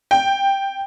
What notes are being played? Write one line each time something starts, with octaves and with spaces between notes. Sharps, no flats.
G5